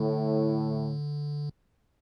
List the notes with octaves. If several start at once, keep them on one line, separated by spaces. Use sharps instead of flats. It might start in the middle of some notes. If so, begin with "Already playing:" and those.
Already playing: A2 D3